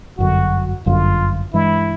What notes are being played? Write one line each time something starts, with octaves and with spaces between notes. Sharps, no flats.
G1 F#2 D3 F#4
G1 F#2 D3 F4
G2 E3 G#3 E4